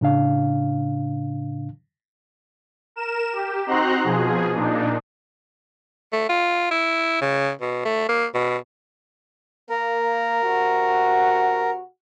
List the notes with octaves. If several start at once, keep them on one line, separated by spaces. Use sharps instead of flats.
A2 C#3 D4 F5
A#4 E7
G4
C4 D#4 F#4 A#5 C6 F#6
B2 F3 G#4
A#2 D4 D#4
A3
F4
E4
C#3
B2
A3
A#3
B2
A#3 A#4
C3 F#4